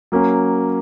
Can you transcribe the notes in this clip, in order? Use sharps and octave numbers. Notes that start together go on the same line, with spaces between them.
F#3 A#3 C#4